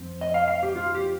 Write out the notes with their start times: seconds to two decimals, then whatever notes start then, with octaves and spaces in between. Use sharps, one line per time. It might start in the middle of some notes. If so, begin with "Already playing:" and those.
Already playing: F2 F3 C4
0.21 D#5
0.34 F5
0.48 F5
0.63 G4
0.76 F4
0.95 G4